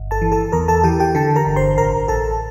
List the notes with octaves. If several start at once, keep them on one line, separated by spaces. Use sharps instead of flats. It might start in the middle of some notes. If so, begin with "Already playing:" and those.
Already playing: G1
A4 A5
E3
A4 A5
E2 A#4 A#5
A4 A5
E3 G4 G5
G4 G5
D3 A4 A5
A#4 A#5
G1
C5 C6
A1 A#4 A#5
A1 A4 A5